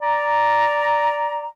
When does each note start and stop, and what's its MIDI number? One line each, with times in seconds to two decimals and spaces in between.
0.02 1.46 74
0.02 1.46 82